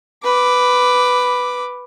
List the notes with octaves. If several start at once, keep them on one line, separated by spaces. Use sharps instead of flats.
B4 D6